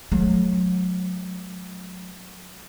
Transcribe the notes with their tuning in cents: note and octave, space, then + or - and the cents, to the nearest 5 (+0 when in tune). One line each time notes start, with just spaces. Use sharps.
F#3 -30 A3 -45